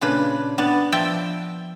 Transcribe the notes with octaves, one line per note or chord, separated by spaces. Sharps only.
A#2 C#3 D4 B4
B3 D4 A5
F3 E5 G5 A5